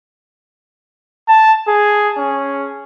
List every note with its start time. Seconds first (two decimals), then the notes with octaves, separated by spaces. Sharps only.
1.29 A5
1.68 G#4
2.18 C#4